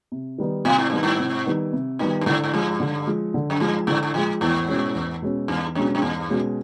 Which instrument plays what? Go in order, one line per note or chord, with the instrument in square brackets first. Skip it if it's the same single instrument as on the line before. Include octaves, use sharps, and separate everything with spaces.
[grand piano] C3
D#3 G3 B3 D#4
[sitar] A2 [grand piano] C3
[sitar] G#2
[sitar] G2 [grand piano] D#3 G3 B3 D#4
[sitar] G#2
[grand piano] C3
D#3 G3 B3 D#4
C3
[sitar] A2 [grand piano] D#3 G3 B3 D#4
[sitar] G2
[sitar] G#2 [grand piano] D3
[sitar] G#2
[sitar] G2 [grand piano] F3 G#3
[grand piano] D3
F3 G#3
D3
[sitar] F#2
[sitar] G2 [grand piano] F3 G#3
[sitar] G#2 [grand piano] D3
[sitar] G#2
[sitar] A2 [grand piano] F3 G#3
[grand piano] E2 [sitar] G#2
[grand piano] B2 G#3 C#4
E2
B2 G#3 C#4
[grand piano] E2 [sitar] G2
[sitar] F#2 [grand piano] B2 G#3 C#4
[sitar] F#2
[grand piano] E2 [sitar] G2
[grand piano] B2 G#3 C#4